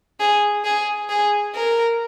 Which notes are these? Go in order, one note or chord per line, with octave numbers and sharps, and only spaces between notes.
G#4
G#4
G#4
A#4